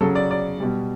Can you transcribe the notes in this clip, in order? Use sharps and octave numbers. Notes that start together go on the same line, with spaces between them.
C#3 F#3 A4
D5
D5
B2 G3